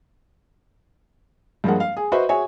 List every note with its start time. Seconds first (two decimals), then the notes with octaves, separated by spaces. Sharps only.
1.64 G2 F3 G#3 A#3 F#5
1.80 F5
1.97 G#4
2.12 F#4 B4 C5 D#5 E5
2.29 F#4 G#4 C#5 E5 G#5